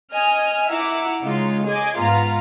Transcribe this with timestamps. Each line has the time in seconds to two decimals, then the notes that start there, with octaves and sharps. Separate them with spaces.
0.12 D#5 G#5 F6
0.69 E4 E5 F#5 A#5 D6
1.22 C#3 G#3 D#4 F4
1.66 G#4 D#5 G#5 D6
1.98 G#2 B3 F4 F5 A#5